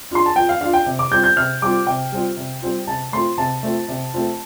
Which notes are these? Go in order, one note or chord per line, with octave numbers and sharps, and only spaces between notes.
D4 F4 C6
A5
F3 G5
F5
D4 F4 F5
G5
C3
D6
G3 C4 F4 G6
G6
C3 F6
G3 C4 F4 D6
C3 G5
G3 C4 F4
C3
G3 C4 F4
C3 A5
A3 C4 F4 C6
C3 A5
A3 C4 F4
C3
A3 C4 F4